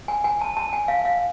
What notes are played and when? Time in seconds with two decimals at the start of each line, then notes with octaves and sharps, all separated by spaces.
0.08 G#5
0.24 G#5
0.41 A5
0.57 A5
0.73 G#5
0.88 F5
1.05 F5